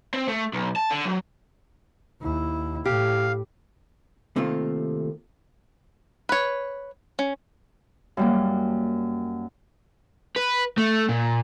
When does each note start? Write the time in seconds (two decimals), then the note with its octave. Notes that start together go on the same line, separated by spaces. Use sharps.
0.14 C4
0.28 A3
0.53 B1
0.76 A5
0.90 D3
1.05 F#3
2.21 D#2 E4
2.85 A2 G4 F5
4.36 C3 D#3 A3 A#3 F4
6.29 B4 C#5
7.19 C#4
8.17 F#2 G3 A#3
10.36 B4
10.78 A3
11.09 A#2